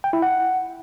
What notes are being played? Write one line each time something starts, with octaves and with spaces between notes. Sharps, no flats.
G5
E4
F#5